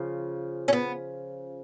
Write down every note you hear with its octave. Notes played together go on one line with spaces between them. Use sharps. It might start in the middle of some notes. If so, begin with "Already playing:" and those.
Already playing: C#3 F3
C#4
B3